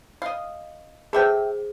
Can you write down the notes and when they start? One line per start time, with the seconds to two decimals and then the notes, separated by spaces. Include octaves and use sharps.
0.22 D#5 F5
1.13 G#4 A4 C5 E5 G5